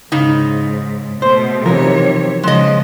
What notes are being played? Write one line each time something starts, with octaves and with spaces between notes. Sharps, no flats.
G#2 C#3 D#4
B2 A3 C5
B1 C3 E3 F3 A#4 C#5
C#3 F3 G#3 D#5